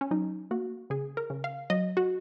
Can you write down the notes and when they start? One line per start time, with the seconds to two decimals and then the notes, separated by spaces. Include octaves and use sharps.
0.01 C#4
0.11 F#3 D#4
0.51 A#3 F#4
0.90 C#3 G#4
1.17 A#4
1.30 C#3
1.44 F5
1.70 F#3 D#5
1.97 F#4